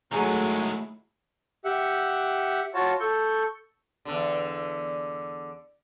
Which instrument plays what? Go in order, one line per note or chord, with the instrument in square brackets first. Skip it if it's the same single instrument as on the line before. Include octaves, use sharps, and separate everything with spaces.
[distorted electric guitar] D#3 G#3 [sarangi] F#3 [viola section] A3 E4 [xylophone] G#4 G#5 A#5
[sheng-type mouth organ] G4 E5 F#5
F4 F#4 C#5 A5
A4 C#6 G6
[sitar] E2 D3